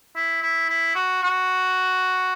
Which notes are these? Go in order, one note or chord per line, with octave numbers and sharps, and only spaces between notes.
E4
E4
E4
F#4
F#4